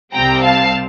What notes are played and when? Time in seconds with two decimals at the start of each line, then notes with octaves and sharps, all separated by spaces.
0.14 C2 C3 G3 C4 G5 A#5
0.43 F5 A5